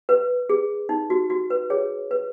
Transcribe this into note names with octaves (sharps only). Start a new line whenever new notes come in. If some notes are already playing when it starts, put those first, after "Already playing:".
B4
G#4
D#4
F#4
F#4
B4
G#4 C#5
B4